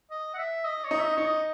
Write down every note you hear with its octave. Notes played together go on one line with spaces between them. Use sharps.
D#5
F#5
E5
D#5
C#5
D#4
E5
D#5
D#4 C#5
D#5